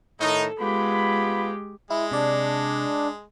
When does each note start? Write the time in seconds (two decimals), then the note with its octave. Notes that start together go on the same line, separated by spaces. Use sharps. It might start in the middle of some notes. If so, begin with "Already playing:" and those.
0.20 A2 D#3 D#4 A4
0.60 G#3 B3 F4 G4 B5
1.90 G#3 E4
2.11 C3 D4 D5